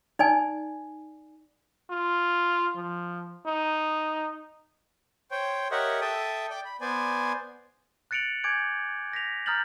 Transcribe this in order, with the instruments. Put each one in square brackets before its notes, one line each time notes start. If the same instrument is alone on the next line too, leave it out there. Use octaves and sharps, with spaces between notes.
[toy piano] D#4 D5 G#5
[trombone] F4
F3
D#4
[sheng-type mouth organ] C5 C#5 G5
G4 A#4 C#5 D#5 E5 F#5
A4 E5 G5 A5 D#6
D5 G5 D6
B5
B3 C5 D5 G#5
[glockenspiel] F#6 A6 C#7 D7 F7 F#7
G#5 D6 G6 G#6 D7
G6 A#6 B6 F7
A#5 D#6 F6 G6 A6 F#7